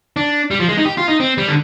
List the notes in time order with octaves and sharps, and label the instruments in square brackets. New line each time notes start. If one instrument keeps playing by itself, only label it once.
[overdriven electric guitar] D4
G3
F3
G#3
D#4
G4
F4
D#4
C4
G3
D3